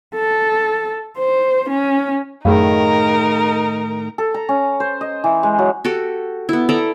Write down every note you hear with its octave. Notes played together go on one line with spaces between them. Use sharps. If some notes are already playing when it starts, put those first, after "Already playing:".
A4
C5
C#4
F#2 A2 D#3 D#4 G#4 A#4 F5
A4
A#5
C#4
C5
D#5
E3
G#3
F#3
F#4 G4 A4
B3 E4
A4 D5 E5 A#5